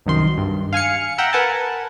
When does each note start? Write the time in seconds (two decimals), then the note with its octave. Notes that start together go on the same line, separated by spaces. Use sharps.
0.06 C2 F#2 D#3 C6
0.38 G2
0.73 F5 G#5 F6 C#7
1.18 E5 F#5 G5 A#5
1.33 A#4 B4 F#5 G#5 A5